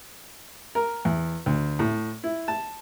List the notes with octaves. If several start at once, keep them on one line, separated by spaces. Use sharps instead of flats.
A#4
E2
D2
A2
E4
A5